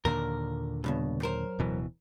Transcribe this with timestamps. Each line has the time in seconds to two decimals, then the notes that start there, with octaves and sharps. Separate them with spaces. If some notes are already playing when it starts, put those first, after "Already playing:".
0.05 D#2 A#2 D3 A#4
0.84 C#2 G2 B2
1.22 F#2 A#4 C5
1.59 D1 B2 E3